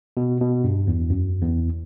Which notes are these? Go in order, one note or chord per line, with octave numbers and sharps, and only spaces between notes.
B2
B2
G2
E2
F#2
E2